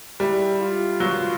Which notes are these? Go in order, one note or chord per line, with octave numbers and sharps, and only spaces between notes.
G3 E4
F4
F#3